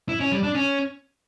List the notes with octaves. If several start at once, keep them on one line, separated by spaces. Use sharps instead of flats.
E4
C#4
G3
D4
C#4